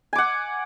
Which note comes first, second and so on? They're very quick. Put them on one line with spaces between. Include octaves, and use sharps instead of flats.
G#5 D6 F#5